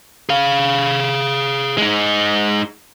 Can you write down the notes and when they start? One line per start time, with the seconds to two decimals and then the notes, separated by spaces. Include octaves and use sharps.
0.29 G#4 F5
1.78 G#3 D#4